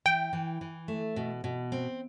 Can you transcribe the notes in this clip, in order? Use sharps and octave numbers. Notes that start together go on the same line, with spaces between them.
E3 G5
E3
E3
A3
B2
B2
C4